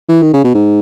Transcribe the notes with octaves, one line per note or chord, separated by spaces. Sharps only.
E3
D#3
C#3
B2
G#2